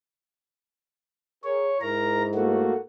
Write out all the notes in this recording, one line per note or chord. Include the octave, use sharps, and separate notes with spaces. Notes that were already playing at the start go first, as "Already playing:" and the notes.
G#4 A#4 C#5
G#2 E4 A#4 A#5
A3 A#3 F#4